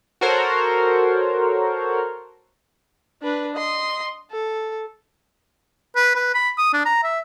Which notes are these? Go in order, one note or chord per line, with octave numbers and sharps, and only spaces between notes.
F#4 A4 A#4 C5 C#5
D4 B4
D#5 C6
A4
B4
B4
B5
D#6
D4
A#5
E5